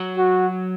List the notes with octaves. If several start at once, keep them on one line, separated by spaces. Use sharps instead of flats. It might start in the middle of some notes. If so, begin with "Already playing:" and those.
Already playing: F#3
F#4